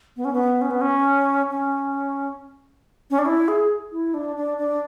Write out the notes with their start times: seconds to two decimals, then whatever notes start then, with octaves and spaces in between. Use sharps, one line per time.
0.17 B3
0.25 C#4
0.33 B3
0.61 C#4
0.71 B3
0.81 C#4
1.49 C#4
3.11 C#4
3.19 D4
3.26 E4
3.48 G#4
3.92 E4
4.14 D4
4.36 D4
4.58 D4